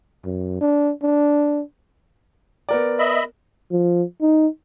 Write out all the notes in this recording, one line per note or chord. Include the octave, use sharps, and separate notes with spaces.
F#2
D4
D4
B3 A#4 D5
D#5 E5 B5
F3
D#4